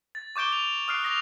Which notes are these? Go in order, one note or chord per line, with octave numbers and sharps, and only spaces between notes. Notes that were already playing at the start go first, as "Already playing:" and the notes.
A6
C#6 D6 G6 D7 G7
F7
D#6 F6 F#6 C7 D7
D#6 A#6 F7